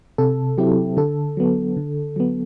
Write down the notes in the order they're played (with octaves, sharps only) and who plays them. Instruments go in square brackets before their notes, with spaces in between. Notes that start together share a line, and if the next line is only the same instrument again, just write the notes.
[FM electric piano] C3 A4
F#3 C4 E4 G4
D3 A4
F#3 B3
D3
F#3 B3